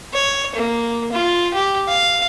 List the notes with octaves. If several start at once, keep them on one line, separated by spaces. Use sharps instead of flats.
C#5
A#3
F4
G4
F5